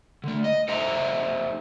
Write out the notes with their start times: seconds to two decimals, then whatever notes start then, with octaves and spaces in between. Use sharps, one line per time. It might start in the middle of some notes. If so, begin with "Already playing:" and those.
0.24 D3 A3
0.44 D#5
0.68 D#4 A4 C5 E5 A#5